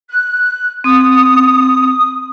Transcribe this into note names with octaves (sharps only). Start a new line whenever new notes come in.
F#6
C4 D#6